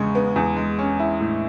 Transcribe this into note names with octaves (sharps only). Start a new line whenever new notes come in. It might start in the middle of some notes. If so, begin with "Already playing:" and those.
Already playing: E2 C#3 G#3 C#6
B3
E2
G#3
C#4
E4
A2